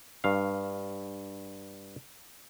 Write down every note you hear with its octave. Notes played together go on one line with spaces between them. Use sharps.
G2 F5